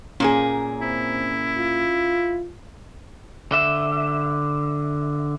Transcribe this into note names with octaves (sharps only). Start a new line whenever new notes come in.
A#2 A#3 C#4 G#4
C4 E4
F4
D3 E5